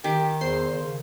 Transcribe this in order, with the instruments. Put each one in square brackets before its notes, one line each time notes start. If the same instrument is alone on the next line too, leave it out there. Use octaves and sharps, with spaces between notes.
[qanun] D#3 [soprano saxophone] G4
[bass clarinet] E2 [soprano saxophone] C5 [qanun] C6
[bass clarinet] C#3